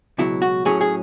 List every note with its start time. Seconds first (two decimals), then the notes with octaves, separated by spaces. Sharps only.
0.18 C#2 B2 F#3 E4
0.42 F#4
0.65 A2 F#3 C#4 G#4
0.81 G#4